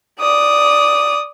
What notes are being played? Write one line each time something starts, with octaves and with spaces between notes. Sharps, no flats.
D5 D#6